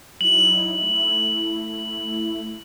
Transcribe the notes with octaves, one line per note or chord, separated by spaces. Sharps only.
F#3 D#4 E4 F#7
A3 E4